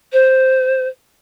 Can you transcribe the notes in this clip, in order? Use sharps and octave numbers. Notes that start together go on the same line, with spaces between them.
C5